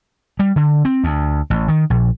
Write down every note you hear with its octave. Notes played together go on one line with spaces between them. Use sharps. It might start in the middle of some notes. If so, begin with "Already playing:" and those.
G3
D3
C4
D2
A1
D#3
A#1